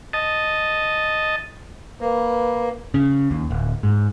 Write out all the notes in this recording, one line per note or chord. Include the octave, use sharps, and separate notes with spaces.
D#5 A5
A#3 B4
C#3
D#2
D1
G#2